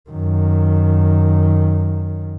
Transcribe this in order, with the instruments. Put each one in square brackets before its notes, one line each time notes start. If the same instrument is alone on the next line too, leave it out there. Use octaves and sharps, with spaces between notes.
[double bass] F#2 D#3